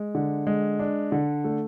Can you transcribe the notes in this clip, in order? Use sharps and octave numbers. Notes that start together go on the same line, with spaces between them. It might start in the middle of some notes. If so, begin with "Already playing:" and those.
Already playing: G#3
D3
G#3
D4
D3
A3